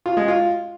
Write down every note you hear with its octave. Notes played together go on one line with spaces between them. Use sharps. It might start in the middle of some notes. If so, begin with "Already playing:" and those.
F4
G#3
F4